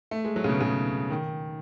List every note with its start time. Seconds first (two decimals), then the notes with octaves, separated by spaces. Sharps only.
0.11 A3
0.24 G#3
0.36 F#3
0.44 C#3
0.49 B2
0.61 C#3
1.10 D#3